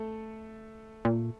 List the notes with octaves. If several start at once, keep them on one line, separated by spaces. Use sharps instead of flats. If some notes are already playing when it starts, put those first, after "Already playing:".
Already playing: A3 A4
A#2